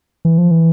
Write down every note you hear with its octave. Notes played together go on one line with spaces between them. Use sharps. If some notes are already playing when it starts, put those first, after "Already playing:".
E3
F3
E3